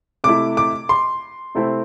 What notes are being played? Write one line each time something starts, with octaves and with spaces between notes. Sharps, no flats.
C3 A3 E4 D6
D6
C6
C3 A3 C4 E4